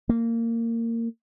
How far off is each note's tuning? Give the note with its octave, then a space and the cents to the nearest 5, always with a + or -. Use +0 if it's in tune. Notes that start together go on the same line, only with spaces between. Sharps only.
A#3 -20